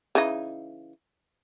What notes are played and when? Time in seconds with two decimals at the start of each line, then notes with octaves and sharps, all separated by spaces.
0.15 C#3 E3 D#4